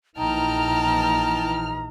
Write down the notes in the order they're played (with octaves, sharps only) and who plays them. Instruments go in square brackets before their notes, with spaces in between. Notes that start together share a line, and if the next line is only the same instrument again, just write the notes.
[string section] A#1 E3 F6 [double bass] D#4 [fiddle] G5 A5 [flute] A#5